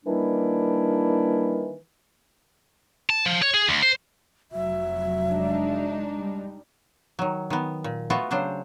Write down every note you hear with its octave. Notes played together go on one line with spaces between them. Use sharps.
D#3 E3 G3 A#3 D4 E4
A5
F3
C#5
G#4
D2
C5
F1 F#3 E5
G#3 D4 D#4
G3
D#3 F#3
D#3 B3
A#2
A3 B3 F4 F#4
C#3 F#3 D4 G4 C5